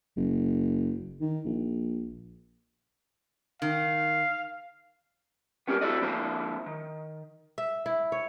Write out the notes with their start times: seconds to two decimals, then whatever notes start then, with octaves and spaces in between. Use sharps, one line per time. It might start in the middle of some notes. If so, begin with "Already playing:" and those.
0.17 F#1
1.21 D#3
1.46 A#1
3.62 D#3 F5
5.68 B3 C#4 G4 A#4
5.81 E4 F#4 A4 D5 D#5
6.01 D3 F3 A#3 E4 C5
6.66 D#3
7.58 E5
7.86 E4
8.12 C#5